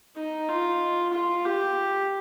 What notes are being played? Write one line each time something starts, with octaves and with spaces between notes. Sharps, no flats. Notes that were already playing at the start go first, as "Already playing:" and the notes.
D#4
F4
F4
G4